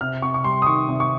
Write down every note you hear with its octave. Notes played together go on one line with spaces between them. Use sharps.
C3 F6
C3 C#6
C#6
G3 C6
D#6
D#3 C#6
C3
C#6